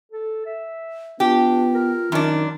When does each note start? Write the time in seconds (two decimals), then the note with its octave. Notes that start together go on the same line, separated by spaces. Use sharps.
0.12 A4
0.46 E5
1.20 B3 D4 F4 G4
1.75 A#4
2.12 F#2 D#3 D4